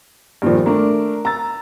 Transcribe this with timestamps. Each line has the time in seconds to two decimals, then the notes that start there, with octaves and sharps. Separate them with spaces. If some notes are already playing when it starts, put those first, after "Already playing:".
0.42 G2 A#2 D#3 F3
0.66 A3 D4 A#4
1.25 A#5 E6 A6